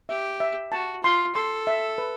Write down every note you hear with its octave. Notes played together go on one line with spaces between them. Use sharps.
G4 E5
E5
F#4 A5
F4 C6
A4 C6
E5
B4